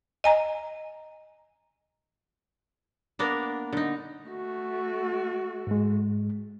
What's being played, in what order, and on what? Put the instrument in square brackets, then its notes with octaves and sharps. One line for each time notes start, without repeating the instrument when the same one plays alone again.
[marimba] D#5 G#5 A#5
[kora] A#3 B3 D4 A#4
D3 D#4
[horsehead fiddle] A3 F#4
[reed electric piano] G#2 G#3